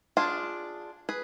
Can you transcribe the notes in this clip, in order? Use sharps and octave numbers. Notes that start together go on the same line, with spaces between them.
D4 F4 G#4
G#4 B4